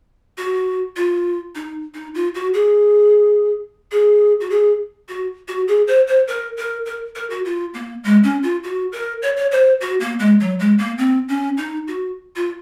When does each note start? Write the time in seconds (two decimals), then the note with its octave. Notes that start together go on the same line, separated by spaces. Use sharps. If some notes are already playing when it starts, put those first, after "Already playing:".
0.38 F#4
0.96 F4
1.55 D#4
1.94 D#4
2.15 F4
2.35 F#4
2.54 G#4
3.91 G#4
4.41 F#4
4.50 G#4
5.09 F#4
5.48 F#4
5.68 G#4
5.87 C5
6.07 C5
6.28 A#4
6.57 A#4
6.86 A#4
7.15 A#4
7.30 F#4
7.45 F4
7.74 A#3
8.04 G#3
8.23 C#4
8.43 F4
8.63 F#4
8.92 A#4
9.22 C#5
9.37 C#5
9.52 C5
9.81 F#4
10.00 A#3
10.19 G#3
10.40 F#3
10.59 G#3
10.78 A#3
10.98 C4
11.29 C#4
11.57 D#4
11.88 F#4
12.36 F4